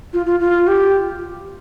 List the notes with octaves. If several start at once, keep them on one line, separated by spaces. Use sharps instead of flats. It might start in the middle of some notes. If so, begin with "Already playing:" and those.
F4
F4
F4
G4